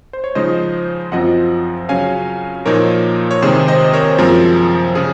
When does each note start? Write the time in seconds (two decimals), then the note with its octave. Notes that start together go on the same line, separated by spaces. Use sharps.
0.13 C5
0.24 C#5
0.35 C#3 F3 G#3 D#4 C5 D#5
1.12 F#2 F3 C4 F4 D#5 F#5
1.89 C#3 F#3 C#4 F5 G#5
2.66 A#2 F3 A#3 D#4 A#4 C#5
3.31 C#5
3.42 C3 D#3 G#3 G#4 C5
3.68 C5 D#5
3.93 A#4 C#5
4.18 F#2 F3 G#3 C4 A#4
4.95 C#3 G#4